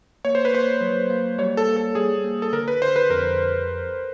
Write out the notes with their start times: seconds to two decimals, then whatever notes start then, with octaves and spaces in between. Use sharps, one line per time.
0.25 A#3 C#5
0.35 C5
0.45 B4
0.53 A#3 C5
0.81 F#3
1.10 A#3
1.39 G3 C#5
1.57 A4
1.67 A#3
1.77 A4
1.95 G3 G#4
2.25 A#3
2.42 A4
2.53 D3 A#4
2.68 B4
2.81 D3 C5
2.96 B4
3.10 F2 A#4